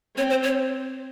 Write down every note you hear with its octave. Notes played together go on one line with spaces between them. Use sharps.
C4 C#5
C5
C#5